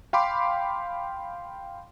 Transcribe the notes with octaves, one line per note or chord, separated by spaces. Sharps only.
F5 G5 B5 C6 D6